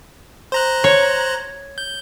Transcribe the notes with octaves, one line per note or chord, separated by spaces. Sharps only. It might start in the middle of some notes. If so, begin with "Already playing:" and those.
C5 A#5 F#6
C#5
G6